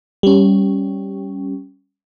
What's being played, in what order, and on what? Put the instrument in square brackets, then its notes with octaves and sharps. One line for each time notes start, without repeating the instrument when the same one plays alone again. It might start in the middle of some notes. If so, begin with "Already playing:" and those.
[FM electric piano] G3 C#4